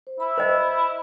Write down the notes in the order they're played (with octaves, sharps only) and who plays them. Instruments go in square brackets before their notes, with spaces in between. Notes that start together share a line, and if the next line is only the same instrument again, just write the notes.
[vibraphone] C5
[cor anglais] E4 [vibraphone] B5 E6
[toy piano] C5 D#5